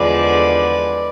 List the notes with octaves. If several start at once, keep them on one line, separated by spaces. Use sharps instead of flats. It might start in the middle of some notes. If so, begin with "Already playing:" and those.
Already playing: E2 D3 F3 G#3 B4 D5